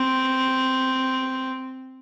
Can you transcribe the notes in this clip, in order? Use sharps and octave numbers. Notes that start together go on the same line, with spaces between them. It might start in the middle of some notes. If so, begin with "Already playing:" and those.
Already playing: C4